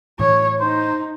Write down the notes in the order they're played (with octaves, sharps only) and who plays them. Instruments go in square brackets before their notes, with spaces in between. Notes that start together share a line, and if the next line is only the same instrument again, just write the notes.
[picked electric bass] A2 E3 [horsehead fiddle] C#5
[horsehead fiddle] D#4 [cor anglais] C5